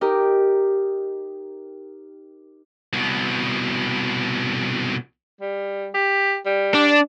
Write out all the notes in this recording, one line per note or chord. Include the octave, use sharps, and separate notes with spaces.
D#4 G4 A#4
C2 B2
G3
G4
G3
D4